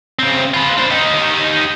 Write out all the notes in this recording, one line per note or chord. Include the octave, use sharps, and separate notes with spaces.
C#3 C4
F4 B4
D4 C5
D#4 G4